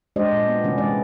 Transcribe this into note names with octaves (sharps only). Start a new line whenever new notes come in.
G#3 D4 G4 C5 D5 D#5
A#2
B3
C3 E3 A3 C4 C#4
C3 E3 G#3 D5